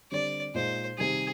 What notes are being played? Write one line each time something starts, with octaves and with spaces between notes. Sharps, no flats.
D3 G3 C4 D5
A#2 G#3 D#4 C5
C3 D#3 G3 G#4